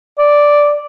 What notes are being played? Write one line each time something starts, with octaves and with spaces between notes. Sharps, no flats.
D5